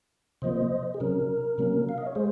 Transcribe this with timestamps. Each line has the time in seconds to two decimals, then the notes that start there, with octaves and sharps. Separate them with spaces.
0.42 C3 F3 A#3 C5 D#5
0.94 G#4
1.00 C3 F#3 C#4 A#4
1.58 C3 F#3 A#3 C#4
1.89 F5
1.98 D#5
2.07 C#5
2.15 G#3 G#4 C5